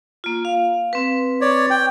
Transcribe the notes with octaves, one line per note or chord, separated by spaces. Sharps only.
A#3 F4
F5
C4 B4
C#5 D5
G5